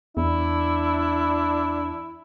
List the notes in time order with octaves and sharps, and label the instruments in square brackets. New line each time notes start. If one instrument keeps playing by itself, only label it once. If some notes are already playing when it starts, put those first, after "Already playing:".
[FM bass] E2 [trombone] D4 [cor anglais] E4